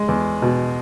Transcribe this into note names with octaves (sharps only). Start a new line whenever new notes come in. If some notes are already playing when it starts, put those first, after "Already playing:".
Already playing: G#3
E2
B2